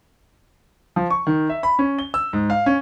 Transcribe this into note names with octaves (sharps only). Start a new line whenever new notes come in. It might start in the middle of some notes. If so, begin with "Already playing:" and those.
F3
C#6
D#3
E5
B5
C#4
G7
E6
G#2
F5
C#4